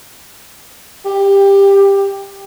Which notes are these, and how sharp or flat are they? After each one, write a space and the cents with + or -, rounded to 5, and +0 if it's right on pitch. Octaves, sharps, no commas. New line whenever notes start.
G4 +15